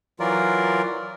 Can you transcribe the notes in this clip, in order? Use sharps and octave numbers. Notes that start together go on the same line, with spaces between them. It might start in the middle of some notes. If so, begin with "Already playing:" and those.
E3 F#3 F4 A#4 D5